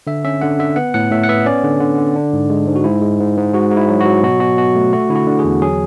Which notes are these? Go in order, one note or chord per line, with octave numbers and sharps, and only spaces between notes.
D3 E5
C#4 E5
D3 F#5
D3 E5
B3 F#5
A2 F#5
A2 E5
F#5
B3 E5
C#4 D5
D3
D3
D3
D4
G#2
G#3
G#2
F#4
G#2 E4
G#3
G#2
G#2
G#2 F#4
G#2
E4
F#3
F#3 F#4
B2 F#4
B2 F#4
B2 F#4
A3
A3 F#4
D3 E4
F#4
D3
G#4
E2
F#3 G#4